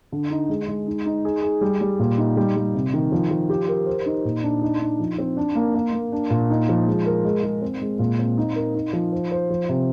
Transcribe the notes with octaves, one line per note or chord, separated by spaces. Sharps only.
D3
D#4
G#3
G#3
D#4
D#4
G#4
G#4
G3
G3
A#2
D#4
G3
G3
C3
D#3
F3
F3
G4
A#4
C5
D#4
A#2
D4
D#4
D#4
F3
C4
D4
A#3
A#3
A#3
D4
A#2
D#4
F3
G#3
A#4
G#3
G#3
C4
G#3
A#2
C4
D#4
A#4
D#4
F3
C5
C5
F3
C3